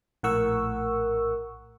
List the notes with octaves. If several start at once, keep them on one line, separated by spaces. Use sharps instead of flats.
A#1 A2 A#4 F#5 C#6 E6